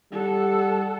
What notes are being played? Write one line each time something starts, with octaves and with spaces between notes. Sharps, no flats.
G3 A4 F#5